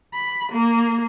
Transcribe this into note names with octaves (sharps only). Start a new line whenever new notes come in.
B5
A#3